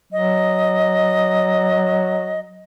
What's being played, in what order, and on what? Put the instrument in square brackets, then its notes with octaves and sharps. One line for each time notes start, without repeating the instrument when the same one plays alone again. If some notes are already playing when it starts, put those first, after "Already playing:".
[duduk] F#3 [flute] D#5